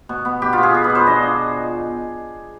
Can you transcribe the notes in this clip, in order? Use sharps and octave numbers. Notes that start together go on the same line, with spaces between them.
B2
B3
B2 G4
F4
B2
G#4
B2 G#4
B4
B2
C5
D4 D#5
F4